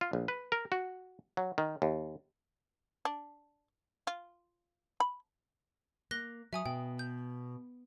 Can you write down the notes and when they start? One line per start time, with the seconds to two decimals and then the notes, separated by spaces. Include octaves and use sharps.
0.01 F4
0.13 A#1
0.28 B4
0.52 A#4
0.72 F#4
1.37 F#3
1.58 D#3
1.82 D#2
3.05 D4
4.07 F4
5.00 B5
6.11 A#3 F#6 A#6 G7
6.53 F#3 E5 G#5 D#6
6.66 B2 G5
6.99 G6